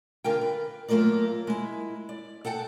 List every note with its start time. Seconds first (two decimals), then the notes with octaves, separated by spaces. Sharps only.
0.24 D3 F4 A#4 G5
0.41 B4
0.88 F#3 A3 A#3 F4 A#4 D5
1.47 G#3 E4
2.09 D5
2.45 A4 F#5 G5 A5